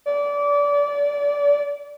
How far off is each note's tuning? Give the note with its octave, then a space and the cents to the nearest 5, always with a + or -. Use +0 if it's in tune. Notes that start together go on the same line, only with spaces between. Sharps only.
D5 -25